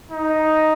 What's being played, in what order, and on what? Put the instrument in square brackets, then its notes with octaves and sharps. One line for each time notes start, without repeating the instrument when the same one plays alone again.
[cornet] D#4